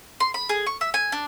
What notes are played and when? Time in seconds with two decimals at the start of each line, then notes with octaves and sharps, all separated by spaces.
0.20 C6
0.34 B5
0.49 G#4
0.66 C#6
0.81 E5
0.94 G#5
1.12 D4